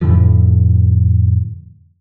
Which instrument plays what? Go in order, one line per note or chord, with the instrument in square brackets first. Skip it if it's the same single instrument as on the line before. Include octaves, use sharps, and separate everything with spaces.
[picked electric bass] F2 A2 D3 F3